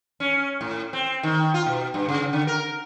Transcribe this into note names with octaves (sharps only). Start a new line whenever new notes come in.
C#4
A2
C4
D#3
F4
B2
G2
C#3
D3
A#4